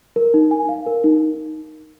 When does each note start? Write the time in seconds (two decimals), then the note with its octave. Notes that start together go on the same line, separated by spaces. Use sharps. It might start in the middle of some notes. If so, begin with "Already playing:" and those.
0.16 A#4
0.34 D#4
0.51 G#5
0.69 F5
0.86 A#4
1.04 D#4